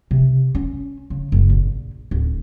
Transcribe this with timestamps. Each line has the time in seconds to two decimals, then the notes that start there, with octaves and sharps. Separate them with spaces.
0.11 C3
0.55 C#4
1.10 C#3
1.32 F#1
1.49 A#1
2.11 D1